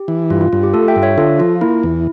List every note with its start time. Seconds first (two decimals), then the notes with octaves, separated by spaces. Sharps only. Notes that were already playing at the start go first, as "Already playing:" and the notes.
Already playing: G4
0.08 E3
0.30 G2 F4
0.41 F4
0.53 G2 F4
0.63 G4
0.74 A3 F4 A4
0.88 E5 G5
0.96 G2
1.03 C#5 E5
1.18 D3 F4 A4
1.39 F3 F4
1.61 A#3 E4
1.83 E2